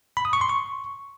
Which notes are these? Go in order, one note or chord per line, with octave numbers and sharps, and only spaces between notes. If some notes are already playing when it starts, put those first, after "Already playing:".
B5
D#6
C#6
C6
C#6